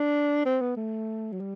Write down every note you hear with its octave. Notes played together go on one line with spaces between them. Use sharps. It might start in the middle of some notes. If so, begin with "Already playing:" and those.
Already playing: D4
C4
B3
A3
F#3
G3